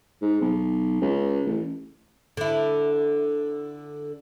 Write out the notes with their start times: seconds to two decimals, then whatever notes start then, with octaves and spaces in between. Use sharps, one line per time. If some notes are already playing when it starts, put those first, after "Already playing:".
0.22 G#2
0.41 B1
1.01 C#2
1.47 A1
2.37 D3 E4